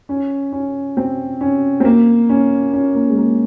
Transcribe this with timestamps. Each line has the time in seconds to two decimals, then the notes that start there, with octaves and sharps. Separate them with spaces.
0.09 C#4
0.53 C#4
0.97 C4
1.41 C#4
1.80 C4
1.85 A#3
2.29 C#4
2.73 C#4
2.95 A#3
3.10 G#3
3.17 A#3